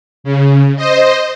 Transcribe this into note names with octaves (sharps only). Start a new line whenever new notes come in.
C#3
C5 D#5